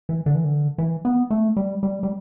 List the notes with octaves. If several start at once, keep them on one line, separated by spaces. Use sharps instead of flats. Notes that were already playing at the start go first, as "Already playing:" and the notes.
E3
D3
E3
D3
E3
B3
A3
G3
G3
G3